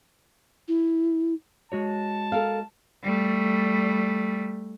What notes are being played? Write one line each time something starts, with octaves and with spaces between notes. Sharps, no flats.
E4
G#3 F#4 C#5 A5
A4 A#4 F5
G3 A3